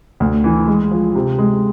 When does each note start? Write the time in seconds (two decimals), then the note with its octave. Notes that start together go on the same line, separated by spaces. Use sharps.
0.20 D2
0.44 E3
0.68 G#3
0.91 F3
1.15 C3
1.39 G#3